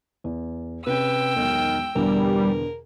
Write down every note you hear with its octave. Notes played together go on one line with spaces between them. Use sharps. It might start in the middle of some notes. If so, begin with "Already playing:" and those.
E2
C3 C#4 B4 G5 E6
E1 B1 D#3
E2 B2 D3 G3 A#4